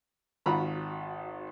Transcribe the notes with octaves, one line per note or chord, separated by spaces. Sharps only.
G#1 F4 F#4 A#5 B5 C#6